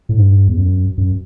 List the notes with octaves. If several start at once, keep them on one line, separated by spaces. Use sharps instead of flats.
A2
G2
E2
F#2
F#2